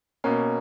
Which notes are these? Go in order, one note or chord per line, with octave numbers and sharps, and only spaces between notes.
B2 A#3 C#4